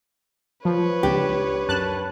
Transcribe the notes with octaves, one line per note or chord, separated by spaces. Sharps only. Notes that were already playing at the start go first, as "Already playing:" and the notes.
F3 B4 C#5
C#2 D4 G4
F#2 A5 F#6